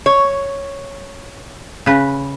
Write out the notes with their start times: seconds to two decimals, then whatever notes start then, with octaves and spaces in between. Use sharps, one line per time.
0.06 C#5
1.86 C#3 B4